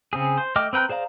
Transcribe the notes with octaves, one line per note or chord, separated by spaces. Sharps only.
C#3 C4 G#4
C5
A3 D#5 G5 D6 F6
C4 B4 G5 A#5 F#6
G#4 C5 D5 F5 A#5